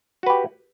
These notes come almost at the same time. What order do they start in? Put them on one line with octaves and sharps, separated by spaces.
F#4 B4 G4